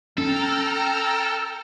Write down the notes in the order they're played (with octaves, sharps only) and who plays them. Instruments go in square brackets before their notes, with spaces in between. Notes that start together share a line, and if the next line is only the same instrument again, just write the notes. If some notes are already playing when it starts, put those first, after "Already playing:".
[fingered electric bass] C#4 [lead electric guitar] A4 [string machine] G5 A#5 F6